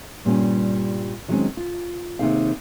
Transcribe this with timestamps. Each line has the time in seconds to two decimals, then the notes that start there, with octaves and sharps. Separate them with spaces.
0.25 G2 A#2 G3 C#4
1.28 D#3 F#3 G#3 A3 C4 C#4
1.57 F4
2.19 D#2 C3 F3 D#4 G#4 F5